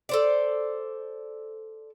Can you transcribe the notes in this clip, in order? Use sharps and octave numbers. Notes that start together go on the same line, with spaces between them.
A4 C5 D5